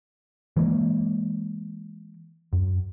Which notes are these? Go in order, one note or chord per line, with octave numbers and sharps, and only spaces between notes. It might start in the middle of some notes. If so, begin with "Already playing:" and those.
E3 G#3 A#3
F#2